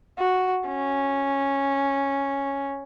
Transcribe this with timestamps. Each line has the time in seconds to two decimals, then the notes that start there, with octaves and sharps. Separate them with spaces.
0.19 F#4
0.67 C#4